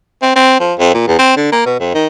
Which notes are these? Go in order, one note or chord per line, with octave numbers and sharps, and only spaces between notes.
C4
C4
F3
F2
A#2
E2
C4
D3
A#3
B2
F2
D#3